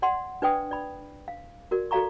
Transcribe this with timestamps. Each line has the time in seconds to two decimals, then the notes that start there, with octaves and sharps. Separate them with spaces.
0.02 D5 F#5 C6
0.42 D4 B4 D5 G5 D#6
0.71 D5 B5
1.28 F5
1.71 F#4 A#4 D5
1.91 F#4 A4 D5 F5 A#5 C#6